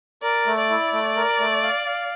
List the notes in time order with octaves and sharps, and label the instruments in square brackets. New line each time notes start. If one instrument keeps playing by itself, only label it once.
[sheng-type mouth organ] A#4 [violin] D5
[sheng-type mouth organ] A3
[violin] D5
[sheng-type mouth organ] E4
A3
A#4
A3
F5
F5